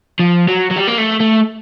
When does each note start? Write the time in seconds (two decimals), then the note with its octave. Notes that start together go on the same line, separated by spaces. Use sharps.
0.19 F3
0.48 F#3
0.71 F#3
0.76 G3
0.88 A#3
0.98 A3
1.20 A3